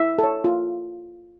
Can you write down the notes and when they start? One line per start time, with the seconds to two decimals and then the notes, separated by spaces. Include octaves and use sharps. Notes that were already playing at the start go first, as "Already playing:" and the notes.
Already playing: E4 E5
0.18 A4
0.23 C#5
0.44 F4